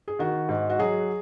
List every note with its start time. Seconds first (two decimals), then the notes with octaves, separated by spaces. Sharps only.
0.08 G#4
0.19 D#3 F#4
0.49 G#2
0.70 F#4
0.79 F#3 G#4